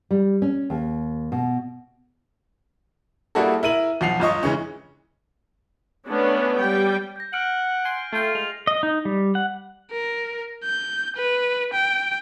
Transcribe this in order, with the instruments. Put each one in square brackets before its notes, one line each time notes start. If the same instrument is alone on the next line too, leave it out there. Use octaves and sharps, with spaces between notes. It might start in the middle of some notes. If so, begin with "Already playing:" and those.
[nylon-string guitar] G3
C#4
D#2
B2
[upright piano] G3 A#3 E4 F#4 G#4 A4
E4 A#4 D#7 F#7
B1 F3 F#5 C7 F7
G1 F4 D#5 C#6
C#3 E3 G#3 C#4
[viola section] A3 B3 C#4 D4
G3 G5
[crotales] G6 A#6
[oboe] F#5 [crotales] F6 D7 F#7
[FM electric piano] G#5 C6
[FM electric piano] A3 G5 [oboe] F4
[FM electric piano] G#3 [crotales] F7
[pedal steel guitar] D#5
D#4
G3
F#5
[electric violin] A#4
G6
B4
G5